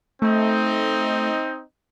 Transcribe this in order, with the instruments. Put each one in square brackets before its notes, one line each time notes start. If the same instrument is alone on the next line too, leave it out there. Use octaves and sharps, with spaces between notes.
[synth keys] A3 [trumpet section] C4 D#4